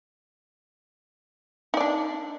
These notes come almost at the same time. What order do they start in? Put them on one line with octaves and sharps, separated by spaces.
D#4 D5 D4